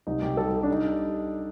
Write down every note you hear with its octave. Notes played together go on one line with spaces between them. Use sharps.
C2 D#4
C2 G4
G3 A4
G3
D4
D#4